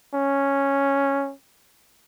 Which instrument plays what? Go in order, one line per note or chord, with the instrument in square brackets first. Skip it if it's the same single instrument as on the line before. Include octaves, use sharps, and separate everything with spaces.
[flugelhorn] C#4